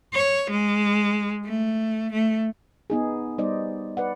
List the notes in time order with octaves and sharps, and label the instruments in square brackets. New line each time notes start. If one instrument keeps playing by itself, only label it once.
[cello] C#5
G#3
A3
A3
[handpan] B3 D#4 G#4
G3 B3 D#4 C5 D5 D#5
B4 D5 F#5